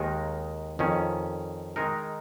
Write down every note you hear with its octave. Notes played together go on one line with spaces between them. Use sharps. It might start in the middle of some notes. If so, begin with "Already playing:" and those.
Already playing: D#2 D#3 G#3 D#4 A#4
F2 D#3 C#4
D#3 G#3 D#4 A#4